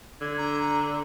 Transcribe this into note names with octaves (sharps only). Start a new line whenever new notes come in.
D3 G#6
A#5